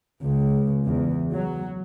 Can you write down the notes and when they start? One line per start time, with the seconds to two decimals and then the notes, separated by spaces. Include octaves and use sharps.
0.21 C#2
0.85 E2
1.33 F#3